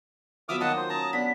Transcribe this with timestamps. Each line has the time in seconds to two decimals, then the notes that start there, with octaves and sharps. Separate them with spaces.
0.49 F3 F#3 B3 E5 D6 D#6 F6
0.61 D#3 A#3 F#4 D#5 F#5 A5 D#6
0.77 C5
0.90 C#4 A5 A#5
1.13 B3 D4 B6